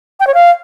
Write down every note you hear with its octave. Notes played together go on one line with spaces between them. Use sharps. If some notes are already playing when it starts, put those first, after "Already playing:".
G5
C#5
F5